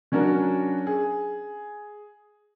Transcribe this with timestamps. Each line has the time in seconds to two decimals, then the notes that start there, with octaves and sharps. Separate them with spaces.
0.12 F#3 C#4 D4 F#4 A#4
0.87 G#4